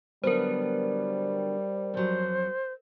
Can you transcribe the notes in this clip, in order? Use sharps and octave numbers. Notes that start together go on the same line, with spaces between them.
D3 F#3 G3 B3 A#4 C5
F2 F#3 C5